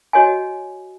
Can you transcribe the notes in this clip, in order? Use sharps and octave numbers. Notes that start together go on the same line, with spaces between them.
F#4 C#5 D#5 F#5 G#5